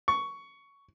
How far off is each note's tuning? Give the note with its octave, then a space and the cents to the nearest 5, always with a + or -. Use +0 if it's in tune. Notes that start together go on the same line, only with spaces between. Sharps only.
C#6 +10